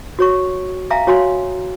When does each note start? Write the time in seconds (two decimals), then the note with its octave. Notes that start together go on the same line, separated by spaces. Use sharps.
0.19 F#4 C#5 C#6
0.90 E5 F5 G#5 A#5
1.07 F#4 C#5 F5 G#5 C6